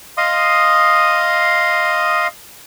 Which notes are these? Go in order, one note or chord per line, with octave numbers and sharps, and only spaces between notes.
D#5 F5 C6 D#6